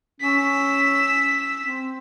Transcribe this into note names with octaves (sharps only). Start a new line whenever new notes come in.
C#4 E6 B6
C4